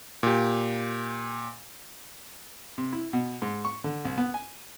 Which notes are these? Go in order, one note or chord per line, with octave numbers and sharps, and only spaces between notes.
A#2 G4
C3
E4
B2
G#2
C#6
D3
C2
B3
G#5